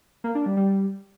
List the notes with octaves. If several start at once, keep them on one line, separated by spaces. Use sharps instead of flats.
A#3
D4
G3
G3